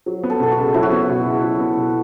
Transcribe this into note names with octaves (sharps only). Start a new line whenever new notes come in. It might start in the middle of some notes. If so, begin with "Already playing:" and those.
F#3
B3
A4
B2 A4
F#4
C#2
F#3 E4
F#4
B3 E4
B2
C#2
F#3
B3
B2